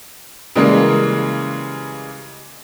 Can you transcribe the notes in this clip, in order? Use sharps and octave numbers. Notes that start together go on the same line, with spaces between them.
C#3 E3 G3 G#3 A#3